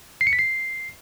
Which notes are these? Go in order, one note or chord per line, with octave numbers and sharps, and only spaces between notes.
C7
C#7
B6
C7